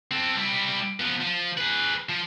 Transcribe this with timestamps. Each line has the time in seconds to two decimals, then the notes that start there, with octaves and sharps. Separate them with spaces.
0.11 C4 A4
0.37 G3 E4
1.00 F3 B3
1.20 F3
1.57 G#4 B4
2.09 F3